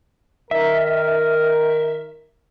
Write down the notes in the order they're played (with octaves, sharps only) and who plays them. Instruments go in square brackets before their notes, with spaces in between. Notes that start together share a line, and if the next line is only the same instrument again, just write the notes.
[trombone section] D#3 A#4 [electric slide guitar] E5